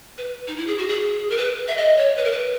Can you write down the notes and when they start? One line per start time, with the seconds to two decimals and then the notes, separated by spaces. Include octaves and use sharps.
0.18 B4
0.48 D#4
0.57 E4
0.67 G#4
0.78 F#4
0.88 G#4
1.30 A#4
1.37 B4
1.68 E5
1.77 D#5
1.97 C#5
2.17 B4
2.25 A#4
2.32 B4